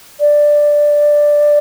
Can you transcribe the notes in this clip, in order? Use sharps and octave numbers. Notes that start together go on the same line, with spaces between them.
D5